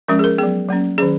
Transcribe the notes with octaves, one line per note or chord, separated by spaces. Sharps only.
F3 G#3 C#4 A#4
G#4
A#4
F#3 B3 G#4
F#3 A#3 C#4
D#3 F#3 C#4 G#4